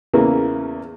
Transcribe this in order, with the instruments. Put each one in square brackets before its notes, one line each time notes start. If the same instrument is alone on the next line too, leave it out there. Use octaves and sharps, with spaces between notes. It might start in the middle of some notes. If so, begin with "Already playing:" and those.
[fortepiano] E2 C#3 E3 A#3